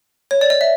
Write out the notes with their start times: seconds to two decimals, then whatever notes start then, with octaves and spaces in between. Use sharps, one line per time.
0.31 C#5
0.41 D5
0.50 D#5
0.61 E5